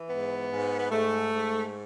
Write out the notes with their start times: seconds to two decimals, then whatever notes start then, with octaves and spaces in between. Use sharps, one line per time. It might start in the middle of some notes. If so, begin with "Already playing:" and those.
Already playing: E3
0.09 G#2 B3
0.51 G#2
0.78 B3
0.91 G#2 A3
1.31 G#2